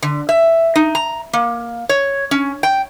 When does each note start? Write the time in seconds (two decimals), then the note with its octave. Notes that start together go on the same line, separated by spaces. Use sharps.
0.02 D3
0.29 E5
0.76 D#4
0.95 A#5
1.33 A#3
1.89 C#5
2.31 C#4
2.63 G5